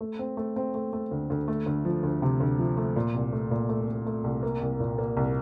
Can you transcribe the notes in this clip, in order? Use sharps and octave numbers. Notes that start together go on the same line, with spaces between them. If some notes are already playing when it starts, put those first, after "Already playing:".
A3
C4
A3
C4
A3
A3
D2
D2
A3
D2
F3
D2
C3
D2
F3
A3
A#2
C2
A3
A#2
A3
A3
A3
C2
A#3
C2
A#2
A#3
C2